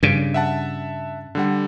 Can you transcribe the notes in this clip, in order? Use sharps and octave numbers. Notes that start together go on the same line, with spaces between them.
G2 C#3
E5 F#5 A5
D3 G3 F#5